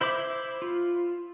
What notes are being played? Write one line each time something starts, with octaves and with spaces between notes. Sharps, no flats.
E4 C5 E5 B5 D6
F4